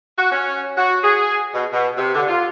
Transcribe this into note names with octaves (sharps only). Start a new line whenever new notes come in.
F#4
C#4
F#4
G#4
B2
B2
C3
D3
F4